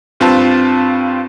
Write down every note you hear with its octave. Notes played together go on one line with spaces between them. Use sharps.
G2 C4 F4 B4 A5